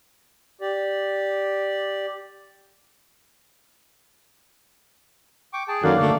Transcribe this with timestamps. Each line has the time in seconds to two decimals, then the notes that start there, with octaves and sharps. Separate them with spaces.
0.61 G4 D5
5.53 G5 C#6 D6
5.68 G#4 G5 A5
5.84 F#2 D#3 A#3 A4 D5 F5 F#5
6.01 D3 A3